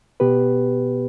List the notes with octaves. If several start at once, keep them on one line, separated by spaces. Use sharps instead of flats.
B2 B3 G4 B4